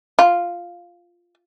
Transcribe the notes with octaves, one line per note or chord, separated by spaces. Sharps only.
F4